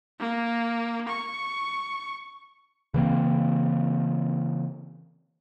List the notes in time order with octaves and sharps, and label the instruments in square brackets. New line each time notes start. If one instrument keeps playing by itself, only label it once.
[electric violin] A#3
C#6
[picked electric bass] C#3 E3 A#3 C4